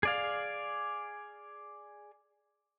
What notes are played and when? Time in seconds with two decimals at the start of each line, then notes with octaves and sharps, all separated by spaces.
0.03 G#4 D5 F5